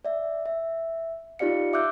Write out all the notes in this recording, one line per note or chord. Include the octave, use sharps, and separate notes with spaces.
D5 E5
E5
D#4 F4 G4 D5 F5 C#7
E5 D6 E6 F#6 G6